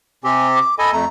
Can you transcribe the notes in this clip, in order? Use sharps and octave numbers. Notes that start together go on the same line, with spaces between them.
C3 C4 G4 G#5
D6
A4 D#5 G#5 B5
F2 A3 A#5